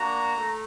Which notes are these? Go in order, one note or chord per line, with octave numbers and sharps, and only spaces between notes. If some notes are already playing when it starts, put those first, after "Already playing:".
Already playing: A#3 D4 F#4 A#5
A3